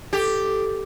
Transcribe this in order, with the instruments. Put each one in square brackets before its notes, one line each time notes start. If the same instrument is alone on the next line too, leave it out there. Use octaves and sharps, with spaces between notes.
[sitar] G4 [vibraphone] A4